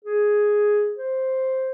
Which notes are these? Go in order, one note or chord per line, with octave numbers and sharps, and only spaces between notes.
G#4
C5